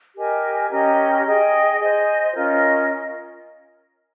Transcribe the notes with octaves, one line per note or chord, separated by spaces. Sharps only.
G4 A#4 D#5 G#5
C#4 G4 A#4 D#5
G#4 D#5 G5
C5 D#5 G#5
C#4 F4 A#4 D#5